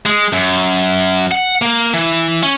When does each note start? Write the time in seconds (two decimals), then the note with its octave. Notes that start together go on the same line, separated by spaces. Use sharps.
0.06 G#3
0.33 F#2
1.31 F#5
1.62 A#3
1.93 E3
2.43 C#4